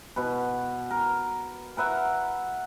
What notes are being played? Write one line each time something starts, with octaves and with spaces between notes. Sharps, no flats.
B2 B4
A#4
A#4 B4 E5 F#5